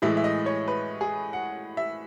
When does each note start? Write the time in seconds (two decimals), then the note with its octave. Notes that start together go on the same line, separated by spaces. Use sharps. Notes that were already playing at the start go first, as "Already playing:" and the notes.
0.02 A2 E3 G#3 E5
0.17 E5
0.24 D#5
0.46 C#5
0.68 B4
1.01 G#4
1.33 F#5
1.77 E5